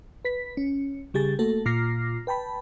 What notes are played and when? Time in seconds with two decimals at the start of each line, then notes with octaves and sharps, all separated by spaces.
0.25 B4 B6
0.57 C#4
1.14 C#3 G3 G4 G#4 A6
1.39 A3 A#3 F#4 A4
1.66 A#2 F4 D6 F6 A#6 C7
2.27 B4 G5 A5 B5